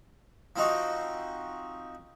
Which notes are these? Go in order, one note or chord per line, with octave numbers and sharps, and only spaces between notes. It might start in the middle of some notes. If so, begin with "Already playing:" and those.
F3 C4 D#4 F#4